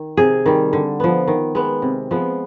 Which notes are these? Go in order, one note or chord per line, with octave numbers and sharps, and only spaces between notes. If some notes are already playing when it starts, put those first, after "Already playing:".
Already playing: D#3
C3 G#4
D#3 G3
D3
F3 B3
D#3
G#3 B3
C3
F3 G#3 B3